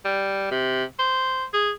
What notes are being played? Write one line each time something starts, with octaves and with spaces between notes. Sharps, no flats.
G3
C3
C5
G#4